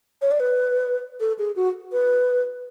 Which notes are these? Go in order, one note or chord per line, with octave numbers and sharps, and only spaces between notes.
C#5
D5
B4
A4
G#4
F#4
B4